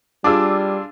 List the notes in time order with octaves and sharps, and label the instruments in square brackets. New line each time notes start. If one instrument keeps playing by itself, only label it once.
[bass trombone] G3 [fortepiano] D4 F4 G#4 [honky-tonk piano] D6 E6